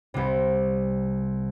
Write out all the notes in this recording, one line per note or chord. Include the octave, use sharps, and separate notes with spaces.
C2 C3